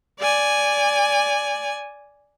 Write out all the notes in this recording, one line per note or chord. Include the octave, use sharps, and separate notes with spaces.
D5 G#5